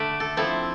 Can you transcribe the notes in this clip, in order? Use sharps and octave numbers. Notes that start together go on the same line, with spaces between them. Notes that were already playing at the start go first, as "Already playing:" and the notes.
Already playing: D3 A3 D4 D5 E5
A4
F3 C4 E4 A4